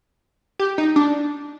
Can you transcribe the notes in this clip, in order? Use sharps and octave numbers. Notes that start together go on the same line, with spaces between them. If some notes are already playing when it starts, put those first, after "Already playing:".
G4
D#4
D4